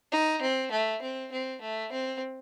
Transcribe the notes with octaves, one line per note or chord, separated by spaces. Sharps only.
D#4
C4
A3
C4
C4
A3
C4